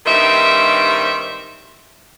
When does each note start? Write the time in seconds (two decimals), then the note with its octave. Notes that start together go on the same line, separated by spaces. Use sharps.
0.06 G2 D#3 G3 C4 D#4 E5